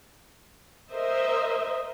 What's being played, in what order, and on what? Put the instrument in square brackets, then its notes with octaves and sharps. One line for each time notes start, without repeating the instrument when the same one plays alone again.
[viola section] A#4 C5 D#5 E5